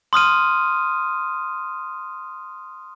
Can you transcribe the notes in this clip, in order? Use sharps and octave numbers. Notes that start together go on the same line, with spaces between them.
C6 D#6 F6 D#7